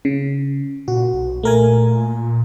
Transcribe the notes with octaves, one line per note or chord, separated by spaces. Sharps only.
C#3
A#2 F#4
B1
A#2 A3 A#4 G#5